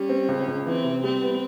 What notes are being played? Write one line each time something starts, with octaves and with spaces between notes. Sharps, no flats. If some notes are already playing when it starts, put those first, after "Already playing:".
Already playing: G3 C#4
C4
C#2
C#2
E3 C4
C3
G3 C4
B3